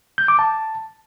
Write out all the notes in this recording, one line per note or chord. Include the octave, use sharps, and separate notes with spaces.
G6
D6
A5